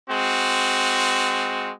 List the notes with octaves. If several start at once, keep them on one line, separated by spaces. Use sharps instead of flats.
G#3 C4 F#4